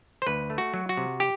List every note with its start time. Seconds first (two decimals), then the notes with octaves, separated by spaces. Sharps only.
0.22 C5
0.27 D2 B4
0.50 A3
0.58 F#4
0.74 F#3
0.89 F#4
0.97 C3
1.20 G4